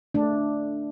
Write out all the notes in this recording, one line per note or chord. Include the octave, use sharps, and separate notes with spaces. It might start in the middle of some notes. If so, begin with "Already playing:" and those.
A3 D4